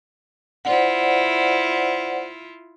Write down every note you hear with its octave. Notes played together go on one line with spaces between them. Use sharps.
E4 F4 C5 D5 F#5